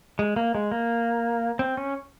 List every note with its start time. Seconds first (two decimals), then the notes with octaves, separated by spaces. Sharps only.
0.19 G#3
0.36 A#3
0.55 G#3
0.71 A#3
1.59 C4
1.77 C#4